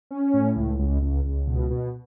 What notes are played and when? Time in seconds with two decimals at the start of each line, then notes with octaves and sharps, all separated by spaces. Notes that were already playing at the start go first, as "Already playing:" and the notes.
0.11 C#4
0.34 A2
0.56 C#2
0.79 C#2
1.02 C#2
1.24 C#2
1.47 B2
1.70 B2